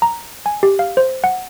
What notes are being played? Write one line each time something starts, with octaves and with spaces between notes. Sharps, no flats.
A#5
G#5
G4
F5
C5
F#5